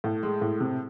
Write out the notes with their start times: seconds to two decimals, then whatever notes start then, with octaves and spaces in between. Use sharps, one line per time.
0.04 A2
0.23 G#3
0.41 A2
0.60 C3